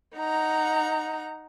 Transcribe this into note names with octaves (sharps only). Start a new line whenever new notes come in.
D#4 F#5 A#5